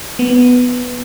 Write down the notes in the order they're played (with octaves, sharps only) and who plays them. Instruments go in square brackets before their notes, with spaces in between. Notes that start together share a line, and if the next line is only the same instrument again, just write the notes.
[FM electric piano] B3